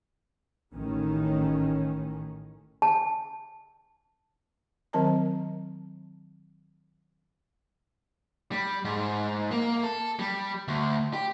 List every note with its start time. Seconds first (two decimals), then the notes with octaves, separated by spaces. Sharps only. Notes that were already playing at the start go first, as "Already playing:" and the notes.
0.73 A1 A2 D#3 C#4
2.82 A5
4.93 D#3 F#3 C4 A#4 A5 A#5
8.52 G3
8.85 G#2
9.51 A#3
9.83 A4
10.20 G3
10.68 D2
11.13 G4